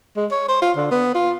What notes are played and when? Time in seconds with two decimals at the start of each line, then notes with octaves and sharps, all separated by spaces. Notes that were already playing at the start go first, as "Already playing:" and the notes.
0.16 G#3
0.31 C#5
0.48 C5
0.62 F4
0.76 D3
0.91 B3
1.14 F4